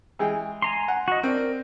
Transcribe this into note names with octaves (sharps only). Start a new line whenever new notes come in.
E3 G#3 G5
G#5 A#5 C6
F#5
F#4 D#5
C4 D4 A#4